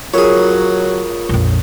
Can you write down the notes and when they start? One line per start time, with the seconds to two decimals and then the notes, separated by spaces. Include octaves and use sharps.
0.14 F#3 F4 G#4 A#4 C#5
1.29 A#1 F2